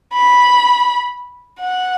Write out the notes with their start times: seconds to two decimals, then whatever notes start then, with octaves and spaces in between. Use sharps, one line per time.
0.14 B5
1.61 F#5